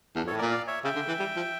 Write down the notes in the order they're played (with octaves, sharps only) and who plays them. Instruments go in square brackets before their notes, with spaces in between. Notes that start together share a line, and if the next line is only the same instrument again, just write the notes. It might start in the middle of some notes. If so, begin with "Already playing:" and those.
[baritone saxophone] E2 [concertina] D4
[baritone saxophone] F2
[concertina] A4 C#5
[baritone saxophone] A2
[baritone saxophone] A#2 [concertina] A#4 D5
[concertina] D5 F5
C#5 E5
[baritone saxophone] C#3 [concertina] E5 G5
[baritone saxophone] D3
E3
G3
F3